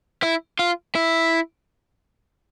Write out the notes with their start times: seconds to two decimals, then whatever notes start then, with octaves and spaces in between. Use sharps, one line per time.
0.23 E4
0.59 F4
0.95 E4